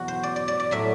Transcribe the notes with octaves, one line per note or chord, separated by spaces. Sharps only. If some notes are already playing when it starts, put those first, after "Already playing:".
Already playing: E2 B2 F#3 F#4
C5
D5
D5
D5
D5
A2 F#3 E5